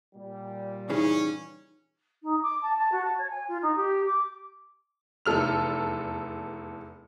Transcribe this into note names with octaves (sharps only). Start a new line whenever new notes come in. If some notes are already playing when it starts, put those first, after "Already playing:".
A#2 G3
C#3 E3 C#4 D#4 G#4
D#4
D6
A5
A5
F#4
A5
C#5
G#5
F4
D#4
G4
D6
F1 E2 A4 F6 F7